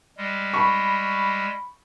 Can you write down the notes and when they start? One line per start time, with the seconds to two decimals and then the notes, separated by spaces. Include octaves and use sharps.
0.17 G3 G#3
0.53 B5 C#6